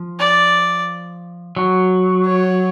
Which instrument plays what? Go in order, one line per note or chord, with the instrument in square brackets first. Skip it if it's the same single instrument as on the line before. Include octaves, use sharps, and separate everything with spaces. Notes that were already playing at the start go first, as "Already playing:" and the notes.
Already playing: [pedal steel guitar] F3
[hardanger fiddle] D5
[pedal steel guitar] F#3
[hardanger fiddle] C#5